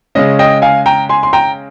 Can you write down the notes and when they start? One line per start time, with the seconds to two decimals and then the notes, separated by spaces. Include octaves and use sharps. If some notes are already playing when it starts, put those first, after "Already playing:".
0.15 C#3 G#3 C#4 D#5
0.39 D#5 G5
0.62 F5 G#5
0.86 G5 A#5
1.09 G#5 C6
1.23 C6
1.33 G5 A#5